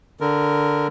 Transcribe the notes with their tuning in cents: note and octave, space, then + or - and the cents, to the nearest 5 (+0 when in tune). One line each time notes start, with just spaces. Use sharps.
D3 -5 A#4 +0